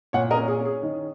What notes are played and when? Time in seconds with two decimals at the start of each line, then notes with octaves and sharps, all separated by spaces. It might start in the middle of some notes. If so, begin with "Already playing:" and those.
0.13 A#2 C#5 F#5
0.31 A#4 D#5
0.37 C#4
0.48 G#4
0.60 C#4
0.65 G#4
0.83 D#3